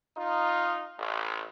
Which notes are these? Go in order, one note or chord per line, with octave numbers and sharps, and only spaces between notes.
D#4 F4
A1